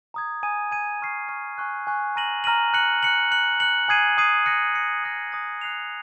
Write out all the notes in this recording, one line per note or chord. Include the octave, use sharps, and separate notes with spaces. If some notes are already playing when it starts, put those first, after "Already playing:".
A#5 D#6 G#6
G#5 D#6 G#6 D#7
G#5 D#6 G#6 D#7
G#5 C#6 F6 C7
G#5 C#6 F6 C7
G#5 C#6 F#6
G#5 C#6 F#6
A#5 F6 A#6 D#7 F#7
A#5 F6 A#6 D#7 F#7
F#6 C#7 F#7
F#6 C#7 F#7
F#6 C#7 F#7
F#6 C#7 F#7
G#5 D#6 G#6 C7 D#7
G#5 D#6 G#6 C7 D#7
F#6 A#6 C#7
F#6 A#6 C#7
D#6 F#6 A#6
D#6 F#6 A#6
F#6 C7 F7